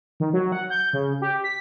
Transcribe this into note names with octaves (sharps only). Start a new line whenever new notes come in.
D#3
F#3
F#5
G6
C#3
G4
B6